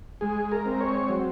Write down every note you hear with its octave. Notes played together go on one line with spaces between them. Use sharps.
G#3 G#4
A#4
C4
C#5
F#3